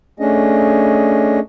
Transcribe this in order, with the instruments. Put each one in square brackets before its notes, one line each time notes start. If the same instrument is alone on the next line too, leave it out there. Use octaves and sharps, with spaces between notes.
[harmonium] A3 C#4 D4 G#4 D#5